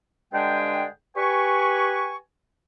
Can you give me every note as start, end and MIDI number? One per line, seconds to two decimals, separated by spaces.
0.33 0.86 43
0.33 0.86 50
0.33 0.86 56
0.33 0.86 62
0.33 0.86 68
0.33 0.86 79
1.17 2.16 67
1.17 2.16 71
1.17 2.16 80
1.17 2.16 85